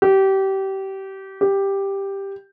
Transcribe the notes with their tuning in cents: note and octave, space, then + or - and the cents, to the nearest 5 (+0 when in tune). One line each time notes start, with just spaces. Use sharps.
G4 -25
G4 +5